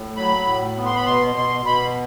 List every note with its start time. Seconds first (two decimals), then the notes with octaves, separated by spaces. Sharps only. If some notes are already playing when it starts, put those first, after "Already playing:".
Already playing: A2
0.17 F#3 B5
0.46 A2
0.76 B3
0.86 C6
0.96 B5
1.06 B2 C6
1.36 B2 C6
1.66 B2 B5